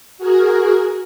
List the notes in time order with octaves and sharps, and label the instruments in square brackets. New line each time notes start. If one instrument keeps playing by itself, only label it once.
[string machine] F#4 G#4 A#4